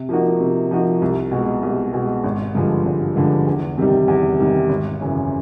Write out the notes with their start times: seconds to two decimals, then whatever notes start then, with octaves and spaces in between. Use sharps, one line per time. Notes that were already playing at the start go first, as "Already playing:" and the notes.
Already playing: C3
0.09 F3 A#3 D#4 F#4
0.40 C3
0.71 F3 A#3 D#4 F#4
1.02 C2
1.31 B2 G#3
1.63 C2
1.94 B2 G#3
2.23 G#1
2.55 G2 D3 F3 G#3
2.85 G#1
3.16 G2 D3 F3 G#3
3.47 E2
3.78 C3 D#3 G3
4.08 E2
4.39 C3 D#3 G3
4.69 G#1
5.01 F#2 C#3 E3